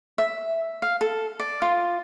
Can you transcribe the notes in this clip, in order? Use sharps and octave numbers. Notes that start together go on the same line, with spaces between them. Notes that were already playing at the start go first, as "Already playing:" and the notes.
E5
F5
A4
D5
F4